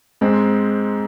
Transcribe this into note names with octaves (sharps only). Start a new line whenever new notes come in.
G#2 G#3 C4